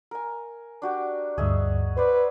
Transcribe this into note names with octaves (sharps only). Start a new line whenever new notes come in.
A#4 G#5
D4 F#4 G4
D2 G2 G#4 D#5 E5
B4 C5 D5